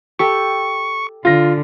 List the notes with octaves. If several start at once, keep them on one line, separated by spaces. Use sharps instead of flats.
G4 A4 C#6
D3 F4 A#6